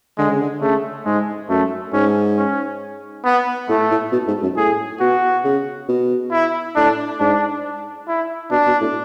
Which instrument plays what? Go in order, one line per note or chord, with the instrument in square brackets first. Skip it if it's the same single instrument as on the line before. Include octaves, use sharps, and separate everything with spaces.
[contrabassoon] D3 [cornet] G#3
[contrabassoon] C#3
D3
[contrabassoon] C#3 [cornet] A3
[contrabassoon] G#2 [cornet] G#3
[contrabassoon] F#2 [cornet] A3
[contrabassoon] G#2 [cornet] C#4
[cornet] C#4
B3
[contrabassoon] A2 [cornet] A3
[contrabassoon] A2
B2
G#2
F#2
[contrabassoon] A2 [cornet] G#4
[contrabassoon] B2 [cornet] F#4
[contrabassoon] C#3
B2
[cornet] E4
[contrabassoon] A2 [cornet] D4
[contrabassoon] G#2 [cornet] D4
[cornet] E4
[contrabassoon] B2 [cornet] D4
[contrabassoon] B2
A2